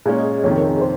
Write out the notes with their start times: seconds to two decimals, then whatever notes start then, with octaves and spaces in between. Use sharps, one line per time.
0.06 A#2 G#3 C#4 G#4
0.19 D#5
0.43 F2 C3 D#3 C#5
0.57 A#4
0.69 G#4
0.81 C5